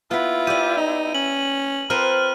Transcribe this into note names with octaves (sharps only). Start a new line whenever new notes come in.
B3 E4 F4 B4
G4 D5 D#7
D#4
C#4 F#7
C4 F4 A#4 B4 F6 D#7